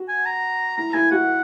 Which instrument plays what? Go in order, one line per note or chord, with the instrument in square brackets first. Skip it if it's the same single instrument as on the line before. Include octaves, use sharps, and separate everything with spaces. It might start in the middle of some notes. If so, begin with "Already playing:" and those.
Already playing: [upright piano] F#4
[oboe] G#5
A#5
[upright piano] E4 [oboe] A#5
[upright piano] E4 [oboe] G#5
[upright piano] F#4 [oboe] F#5